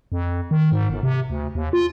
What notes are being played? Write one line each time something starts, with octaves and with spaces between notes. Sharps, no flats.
F2
D#3
G#2
G1
C3
D2
D#2
F4